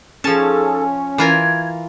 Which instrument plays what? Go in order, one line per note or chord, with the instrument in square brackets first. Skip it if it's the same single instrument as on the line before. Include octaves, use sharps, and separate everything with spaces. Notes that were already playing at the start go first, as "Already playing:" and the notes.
[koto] F3 A5 [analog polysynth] C#4 [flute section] D#4 G#4 A4
[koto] E3 F4 A#4 [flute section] G#6